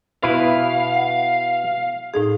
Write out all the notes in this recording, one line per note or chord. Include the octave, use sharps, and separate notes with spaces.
B2 E4 B4 F5
F#5
A2 D#4 G#4